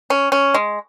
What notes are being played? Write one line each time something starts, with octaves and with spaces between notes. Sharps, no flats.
C#4
C#4
G#3